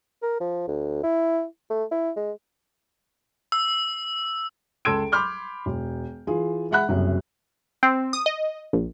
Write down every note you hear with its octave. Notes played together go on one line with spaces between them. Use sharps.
A#4
F3
D2
E4
A3
E4
G#3
E6
C#2 A4 C6 E6 G#6 D7
B5 C6 D6 F6 G6
E1
E3 F4 G#4
G#3 E5 F#5 B5 F#6
F#1 C2 F#2
C4
D#6
D#5
A#1